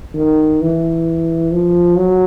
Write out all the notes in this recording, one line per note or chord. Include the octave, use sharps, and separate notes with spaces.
D#3
E3
F3
F#3